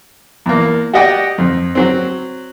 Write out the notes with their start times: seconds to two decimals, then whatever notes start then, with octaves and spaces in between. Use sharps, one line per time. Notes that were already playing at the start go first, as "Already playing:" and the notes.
0.46 E2 A#3
0.94 F#4 G4 D5 D#5 F#5 G5
1.38 F2
1.75 F#3 C4